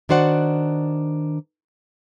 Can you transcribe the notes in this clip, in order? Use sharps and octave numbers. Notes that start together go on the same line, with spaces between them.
D#3 D4 F#4 C5 D5 F#5